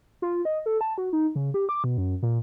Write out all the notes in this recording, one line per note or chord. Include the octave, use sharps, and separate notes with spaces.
F4
D#5
A4
A5
F#4
D#4
C#3
G4
D6
B2
F#2
A#2